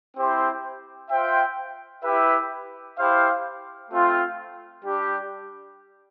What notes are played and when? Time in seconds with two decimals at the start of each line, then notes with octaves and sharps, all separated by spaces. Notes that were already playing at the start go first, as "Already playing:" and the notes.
0.16 C4 E4 G4 C5
1.10 F4 C5 E5 G5
2.03 E4 G4 B4 E5
2.97 E4 G4 C5 F5
3.90 A3 C4 F4
4.84 G3 D4 G4